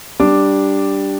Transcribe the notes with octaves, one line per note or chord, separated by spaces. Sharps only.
G3 D4 D6